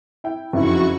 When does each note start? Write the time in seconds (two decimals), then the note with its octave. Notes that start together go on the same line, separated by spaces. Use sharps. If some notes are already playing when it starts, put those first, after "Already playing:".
0.24 E4 G5
0.53 F#1 F2 D#4 E4 F#4 C#6